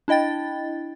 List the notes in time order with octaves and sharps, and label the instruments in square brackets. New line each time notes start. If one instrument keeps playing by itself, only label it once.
[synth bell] D4 E4 D#5 G5 A6